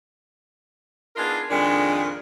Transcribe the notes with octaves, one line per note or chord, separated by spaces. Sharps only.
B3 D4 D#4 F4 G#4 A#4
F2 A#2 D#3 G#3 D4